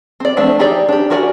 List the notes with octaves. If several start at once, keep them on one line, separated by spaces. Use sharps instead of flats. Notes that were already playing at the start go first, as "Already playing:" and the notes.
C4 D5
F3 A3 C4 D4
D#4 G4 G#4 D5
D4 G4
E4 F#4 A#4 D5 G#5